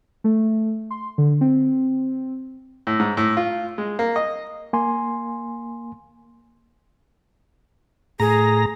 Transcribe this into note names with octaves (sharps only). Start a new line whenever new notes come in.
A3
C6
D3
C4
A2
G#2
A2
F4
G#3
A#3
D#5
A#3 G#5 C6
A2 G#4 A#5